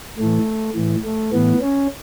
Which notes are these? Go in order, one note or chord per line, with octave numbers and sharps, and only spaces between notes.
A2 E3 A3
A2 E3
A3
A2 E3 B3
C#4